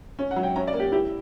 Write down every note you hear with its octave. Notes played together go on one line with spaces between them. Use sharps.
C#4
F#5
F#3
G5
C#4 A#5
D5
A#3
G4
E4 G4